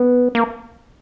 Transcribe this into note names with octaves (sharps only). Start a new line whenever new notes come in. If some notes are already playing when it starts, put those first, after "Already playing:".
Already playing: B3
A#3